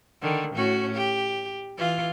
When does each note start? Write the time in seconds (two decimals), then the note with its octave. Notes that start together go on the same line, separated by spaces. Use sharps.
0.22 D3 D#3
0.54 A2 C#4 F#4
0.94 G4
1.77 E3 F4